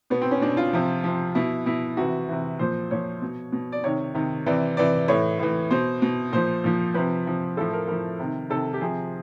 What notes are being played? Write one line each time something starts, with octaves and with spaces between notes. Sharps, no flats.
B2 B3
C4
C#4
B2 D4
F4
C3 F3
C3 F3
B2 E4
B2 E4
C3 E3 F#4
C3 E3
A#2 F3 C5
A#2 F3 C#5
B2
B2
D5
C3 D#3 C#5
C3 D#3
C3 E3 D5
C3 E3 D5
A2 E3 C#5
A2 E3
B2 C5
B2
A#2 F3 C5
A#2 F3
C3 F3 B4
C3 F3
A2 F3 A4
A#4
A2 F3 A#4
C3 D#3
C3 D#3 A4
G4
C3 F3 G#4